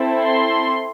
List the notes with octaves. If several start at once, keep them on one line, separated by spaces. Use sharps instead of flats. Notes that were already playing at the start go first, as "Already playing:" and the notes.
Already playing: C4 E4 A4
C6